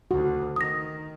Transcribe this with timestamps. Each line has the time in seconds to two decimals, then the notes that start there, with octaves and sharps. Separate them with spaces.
0.11 D2 C#3 F#4
0.56 D#3 D#6 A#6